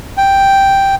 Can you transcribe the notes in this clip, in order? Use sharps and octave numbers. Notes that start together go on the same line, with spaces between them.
G5